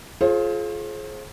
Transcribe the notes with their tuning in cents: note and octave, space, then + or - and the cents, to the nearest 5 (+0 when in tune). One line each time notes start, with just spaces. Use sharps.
F4 +0 G#4 +35 C5 +35